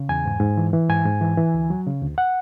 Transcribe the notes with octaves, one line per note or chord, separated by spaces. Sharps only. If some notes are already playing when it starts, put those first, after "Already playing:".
Already playing: C#3
E2 G#5
G#2
G#2
E3
E3
G#2 G#5
G#2
E3
E3
D2
F#3
C#3
D2
F#5